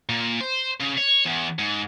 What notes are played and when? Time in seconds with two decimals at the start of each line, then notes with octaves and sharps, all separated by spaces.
0.09 A#2
0.41 C5
0.80 C#3
0.98 C#5
1.26 E2
1.59 G#2